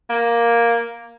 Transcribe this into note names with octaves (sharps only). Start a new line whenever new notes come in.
A#3